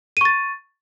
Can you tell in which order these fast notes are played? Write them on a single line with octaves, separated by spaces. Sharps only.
D#7 C#6 A6